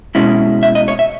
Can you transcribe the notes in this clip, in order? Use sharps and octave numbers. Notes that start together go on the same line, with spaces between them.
B2 G#3 C#4 E4
E5
D#5
C#5
E5